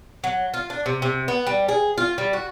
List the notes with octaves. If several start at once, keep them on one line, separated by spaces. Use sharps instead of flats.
F#3
F4
D4
C3
C3
B3
G3
G#4
F4
G3
F#4